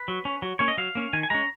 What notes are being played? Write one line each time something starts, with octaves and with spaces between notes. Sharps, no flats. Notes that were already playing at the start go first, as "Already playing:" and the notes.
Already playing: B4
F#3
C#4
F#3
A#3 C#4 C#5
D#5
F#3 F5
A#3 C#4
D#3 G#5
G#5
G#3 C#4 A#5